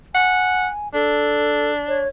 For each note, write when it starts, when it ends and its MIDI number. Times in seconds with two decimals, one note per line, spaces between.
0.14 0.67 78
0.14 0.88 80
0.94 2.03 62
0.94 1.72 69
1.88 2.08 73